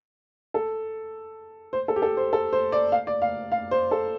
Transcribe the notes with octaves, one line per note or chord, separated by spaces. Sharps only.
A4
C5
A4
G4
A4
C5
A4
C5
D5
F5
D5
F5
F5
C5
A4